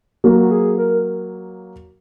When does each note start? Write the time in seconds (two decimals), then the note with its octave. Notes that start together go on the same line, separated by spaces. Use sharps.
0.24 F#3 A#3 F#4
0.42 F#4
0.51 G#4
0.78 A#4